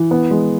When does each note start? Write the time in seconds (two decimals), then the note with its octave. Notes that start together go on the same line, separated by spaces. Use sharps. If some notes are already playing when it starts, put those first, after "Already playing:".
Already playing: E3
0.11 B3
0.31 G#3